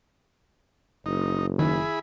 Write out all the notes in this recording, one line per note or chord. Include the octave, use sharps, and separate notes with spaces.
F#1 D#4
D#3 E4 G#4 B5